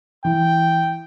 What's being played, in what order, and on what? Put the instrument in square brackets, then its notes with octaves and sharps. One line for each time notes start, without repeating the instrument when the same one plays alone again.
[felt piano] E3 [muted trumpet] G5